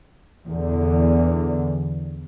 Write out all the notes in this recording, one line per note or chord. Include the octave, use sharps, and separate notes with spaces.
E2 D3